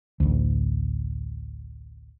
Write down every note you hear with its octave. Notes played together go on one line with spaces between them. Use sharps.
A1 D2